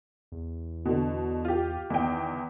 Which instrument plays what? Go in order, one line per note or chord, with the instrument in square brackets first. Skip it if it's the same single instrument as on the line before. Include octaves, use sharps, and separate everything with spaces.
[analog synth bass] E2
[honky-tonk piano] B2 D3
F4 G4
[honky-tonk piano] E2 G5 [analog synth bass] D#3